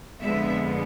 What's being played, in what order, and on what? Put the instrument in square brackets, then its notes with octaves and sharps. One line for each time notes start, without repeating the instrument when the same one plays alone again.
[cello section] F2 D3 G#3 B3 E5